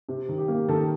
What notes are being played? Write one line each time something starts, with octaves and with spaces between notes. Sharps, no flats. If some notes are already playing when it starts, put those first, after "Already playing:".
C3
D#3
G4
A#3
D#3 A4